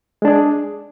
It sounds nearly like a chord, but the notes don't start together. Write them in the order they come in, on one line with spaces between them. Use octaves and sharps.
G#3 D4 G#4